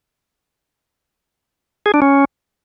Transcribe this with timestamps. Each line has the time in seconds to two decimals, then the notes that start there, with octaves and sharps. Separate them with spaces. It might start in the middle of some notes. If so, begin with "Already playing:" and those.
1.86 G#4
1.94 D4
2.02 C#4